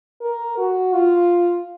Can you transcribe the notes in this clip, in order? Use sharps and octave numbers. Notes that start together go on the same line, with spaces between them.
A#4
F#4
F4